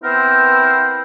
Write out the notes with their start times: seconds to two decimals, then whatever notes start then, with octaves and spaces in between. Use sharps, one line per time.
0.03 B3 C4 E4 A#4 C5